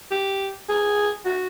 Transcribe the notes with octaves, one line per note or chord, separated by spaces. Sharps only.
G4
G#4
F#4